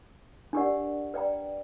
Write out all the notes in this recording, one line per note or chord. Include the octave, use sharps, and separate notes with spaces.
D4 G4 A#4 D5 F#5
B4 D5 G5 A#5